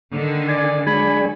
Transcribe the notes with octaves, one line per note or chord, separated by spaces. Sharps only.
D3 D#3
D5 G#5
F#3 G#3 D4 G#5 B5